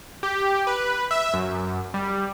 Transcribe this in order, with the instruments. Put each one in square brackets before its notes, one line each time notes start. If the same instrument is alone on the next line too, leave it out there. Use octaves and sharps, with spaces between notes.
[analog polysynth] G4
B4
E5
F#2
G3